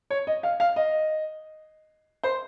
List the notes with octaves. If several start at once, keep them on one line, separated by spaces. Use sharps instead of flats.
C#5
D#5
F5
F5
D#5
C5